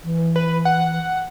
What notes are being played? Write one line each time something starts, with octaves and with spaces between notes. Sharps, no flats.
E3
B4
F#5